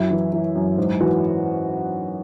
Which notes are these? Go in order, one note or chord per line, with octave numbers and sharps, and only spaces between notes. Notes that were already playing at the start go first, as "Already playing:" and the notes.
Already playing: F#2 F#3 E4 E5
E3
E3
F#2
G#2
E3 F#4 F#5